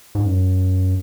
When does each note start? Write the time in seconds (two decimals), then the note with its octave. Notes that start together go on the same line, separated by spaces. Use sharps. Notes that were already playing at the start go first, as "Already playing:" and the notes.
0.15 G#2
0.26 F#2